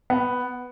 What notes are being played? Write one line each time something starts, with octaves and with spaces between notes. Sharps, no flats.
B3